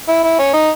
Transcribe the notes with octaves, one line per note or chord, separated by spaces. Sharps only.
E4
E4
C#4
D#4